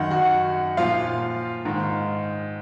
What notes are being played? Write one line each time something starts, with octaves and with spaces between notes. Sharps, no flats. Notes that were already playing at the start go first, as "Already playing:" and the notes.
Already playing: F#2 D#3 F#5
F#4 F#5
A#2 F3 F4 F5
G#2 D#3